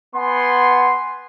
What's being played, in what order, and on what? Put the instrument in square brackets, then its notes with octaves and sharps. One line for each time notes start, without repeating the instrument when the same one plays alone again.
[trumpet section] B3 F#5 G#5 C6